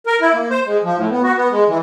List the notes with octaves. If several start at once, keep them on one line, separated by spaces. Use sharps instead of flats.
A#4
E4
A#3
C5
G#3
F3
A2
B3
F#4
B3
G#3
E3